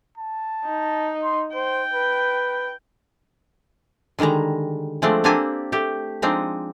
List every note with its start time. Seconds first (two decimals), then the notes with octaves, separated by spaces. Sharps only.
0.17 A5
0.66 D#4
1.23 C6
1.54 C5 G5
1.93 B4
4.19 D3 D#3 G3 G#3 A#5
5.02 F3 G#3 A3 C4 D4
5.24 A#3 C4 D4 G4 A4 G#5
5.72 A3 G4
6.22 F3 G#3 C4 D4 D#4